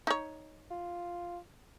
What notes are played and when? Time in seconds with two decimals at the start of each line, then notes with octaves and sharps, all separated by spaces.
0.07 D#4 C#5
0.70 F4